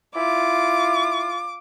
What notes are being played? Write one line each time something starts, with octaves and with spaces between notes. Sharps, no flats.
E4 F4 D6